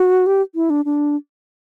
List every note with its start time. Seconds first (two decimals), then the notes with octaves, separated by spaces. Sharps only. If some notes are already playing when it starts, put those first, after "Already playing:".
Already playing: F#4
0.26 G4
0.55 E4
0.70 D4
0.85 D4